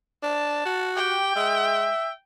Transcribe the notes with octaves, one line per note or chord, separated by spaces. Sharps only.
D4 A5
F#4
G4 G5
G#3 E5